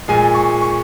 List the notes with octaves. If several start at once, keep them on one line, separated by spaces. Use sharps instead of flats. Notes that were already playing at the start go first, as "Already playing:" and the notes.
A#2 F3 G#3 G#5
C#6
C#6